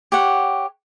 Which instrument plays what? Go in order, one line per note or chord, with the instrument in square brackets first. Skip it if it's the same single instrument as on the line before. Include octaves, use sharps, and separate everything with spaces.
[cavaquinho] G4 C#5 F#5